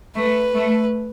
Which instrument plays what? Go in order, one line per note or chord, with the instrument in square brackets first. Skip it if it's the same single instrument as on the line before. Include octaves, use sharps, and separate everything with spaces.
[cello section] A3 [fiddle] B4
[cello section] A3